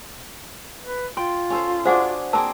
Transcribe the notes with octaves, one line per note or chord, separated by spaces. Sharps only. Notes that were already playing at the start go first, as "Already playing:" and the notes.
B4
F4 G5 C6
C#4 A4 C5
D4 F#4 G#4 C5 F#5 D6
A#3 C4 G#4 A#4 A5